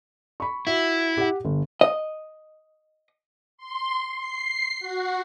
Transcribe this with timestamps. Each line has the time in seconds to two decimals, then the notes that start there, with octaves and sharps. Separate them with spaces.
0.40 B5 C#6
0.67 E4 F#4 E5
1.17 G4 F#5
1.45 G1
1.81 D#5
3.57 C6
4.19 C7
4.80 F#4